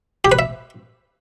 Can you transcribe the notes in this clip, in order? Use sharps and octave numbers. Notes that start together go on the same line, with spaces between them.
G4
B4
E5